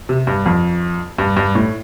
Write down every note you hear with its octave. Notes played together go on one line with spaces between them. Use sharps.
C3
G2
F2
G2
G2
A2